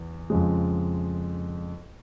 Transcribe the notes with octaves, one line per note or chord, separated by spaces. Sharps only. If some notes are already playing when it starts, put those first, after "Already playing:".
Already playing: E2
F2 C#3 F3 G#3